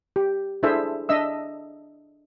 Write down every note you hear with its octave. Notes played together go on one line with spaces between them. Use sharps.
G4
D4 E4 G#4 A4 C5 E5
D4 D#5 E5 E6